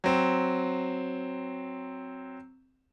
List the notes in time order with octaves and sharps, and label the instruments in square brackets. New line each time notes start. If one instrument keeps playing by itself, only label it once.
[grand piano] F#3 C4